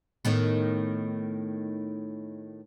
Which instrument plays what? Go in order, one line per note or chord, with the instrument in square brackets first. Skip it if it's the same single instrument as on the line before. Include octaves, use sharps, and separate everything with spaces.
[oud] A2 D#3 B3